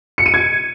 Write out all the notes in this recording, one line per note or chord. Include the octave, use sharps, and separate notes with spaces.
C#7
D#7
G#6